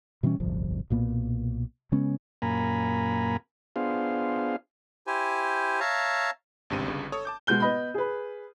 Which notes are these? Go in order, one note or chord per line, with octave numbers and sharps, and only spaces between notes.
B2 E3 G3 C#4
D1 G1 C2 F3
B1 A#2 A#3 B3
C#3 G#3 B3 C#4
F#2 A#2 A#3 G#5 A#5 B5
B3 D4 F4 G#4 C5 F5
E4 G4 C5 G#5
C#5 E5 F5 A5 A#5
G#1 C#2 G2 C3 C4 D#7
G1 G2 C#3
A4 C#5 D#6
A5 D6 G6
B2 G#3 G6 G7
B3 D#5 B5
G#4 B4